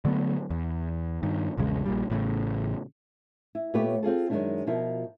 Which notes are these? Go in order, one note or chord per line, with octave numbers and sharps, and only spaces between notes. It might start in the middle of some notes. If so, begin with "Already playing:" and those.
D3 F#3 A3 B3
E2
G2 D#3
A#1 E2 C#3 G#3
A#1 A#2 G3
A1 A2 C#3
E4
A#2 A3 B3 G4 B4 C#5
C4 F4 G#4 A4
F#2 D#3 F3 G#3 D4 E4
B2 F3 E4 F4 A#4